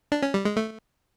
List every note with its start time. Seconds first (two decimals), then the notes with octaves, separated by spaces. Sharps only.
0.12 D4
0.22 C#4
0.34 G3
0.45 G#3
0.57 A3